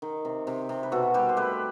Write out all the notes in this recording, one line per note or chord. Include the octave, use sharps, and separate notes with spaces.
D#3
C3
C3
C3
B4
B2 F#4 A4
G3 G4 B4
C5
A3 G4 B4